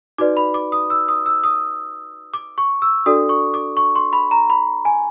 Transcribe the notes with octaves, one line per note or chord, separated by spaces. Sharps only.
D#4 F#4 B4 D5 D6
B5
D6
D#6
E6
D#6
E6
D#6
D6
C#6
E6
D4 F#4 A4 D5 D#6
C#6
D6
C#6
C6
B5
A#5
B5
G#5